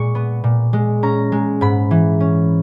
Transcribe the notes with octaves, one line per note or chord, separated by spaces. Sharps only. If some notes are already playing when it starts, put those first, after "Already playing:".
Already playing: A#2 G#3 C#6
B3
A#2
G#3
C#4 A#5
G#3
G#2 B5
E3
C#4